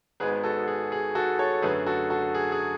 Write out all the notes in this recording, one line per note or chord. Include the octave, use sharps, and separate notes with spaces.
G#1 G#2 G#3 B3 G#4 B4
F#4 A4
G#4
G#4
F#4 A4
A4 C#5
F#2 D3 A3 G#4 B4
F#4 A4
F#4 A4
G#4
G#4